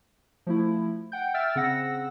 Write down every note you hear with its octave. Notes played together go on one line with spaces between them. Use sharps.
F3 A3 E4
F#5 G5 G6
E5 G5 E6 F6 A6
C#3 C4 F#5 E6 A#6